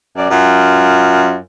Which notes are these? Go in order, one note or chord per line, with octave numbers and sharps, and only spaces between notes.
F#2 D5
F#2 F4